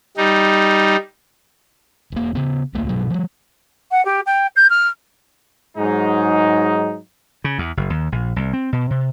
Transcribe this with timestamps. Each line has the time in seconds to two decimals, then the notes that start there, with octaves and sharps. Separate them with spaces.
0.17 G3 D#4
2.12 E1 A#3
2.35 C#3 B3
2.74 D1 C#2 A3 A#3
2.89 G2 B2 F#3
3.10 F3 G3
3.91 F#5
4.05 G4
4.26 G5
4.56 G6
4.70 F6
5.77 G#2 F#3 G#3 D#4
7.44 C#3
7.58 E2
7.77 F#1
7.90 D#2
8.12 A#1
8.36 C2
8.53 C4
8.73 B2
8.90 C3